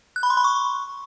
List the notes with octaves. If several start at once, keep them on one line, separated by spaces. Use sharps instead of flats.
F#6
B5
C6
B5
C#6